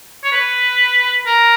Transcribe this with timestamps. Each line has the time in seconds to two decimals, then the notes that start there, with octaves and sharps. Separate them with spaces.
0.24 C#5
0.32 B4
1.27 A#4